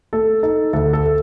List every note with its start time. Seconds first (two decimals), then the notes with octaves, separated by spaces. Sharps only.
0.13 A3 A4
0.43 D#4 A4
0.73 D2 A4
0.93 A4